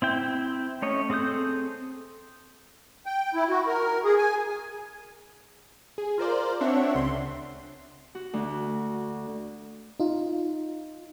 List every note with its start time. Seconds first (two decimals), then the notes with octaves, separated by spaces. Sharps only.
0.02 C4 E4 G5
0.82 A3 C#4 C#5 D#5
1.10 C4 G#4 A4 D#6 G6
3.06 G5
3.35 E4
3.49 F#4
3.67 A#4
4.04 G#4
4.17 G#5
5.98 G#4
6.18 F4 A#4 C5 D5
6.61 C4 D4 C#5 E5 F#5
6.95 C#2 C#3 C6
8.15 F#4
8.33 D2
10.00 D#4 F4